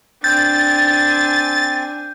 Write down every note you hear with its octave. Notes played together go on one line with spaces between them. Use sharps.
C4 D4 G#5 G6 A6